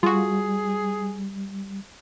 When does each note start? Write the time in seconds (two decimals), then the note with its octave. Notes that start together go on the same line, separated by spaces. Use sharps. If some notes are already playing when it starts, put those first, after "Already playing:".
0.03 G3 F4 F#4 G#4